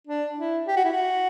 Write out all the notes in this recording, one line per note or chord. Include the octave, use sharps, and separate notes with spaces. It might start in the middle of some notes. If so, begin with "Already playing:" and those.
D4
E4
G4
F#4
E4
F#4